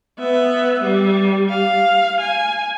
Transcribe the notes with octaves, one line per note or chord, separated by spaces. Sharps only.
B3 E5
G3
F5
G#5